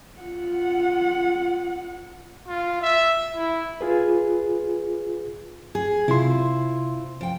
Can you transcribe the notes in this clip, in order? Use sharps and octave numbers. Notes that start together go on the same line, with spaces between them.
F4 F#5
F4
E5
E4
F4 G#4 B4
G#4
C3 E4 F4 C5 C6
F3 G5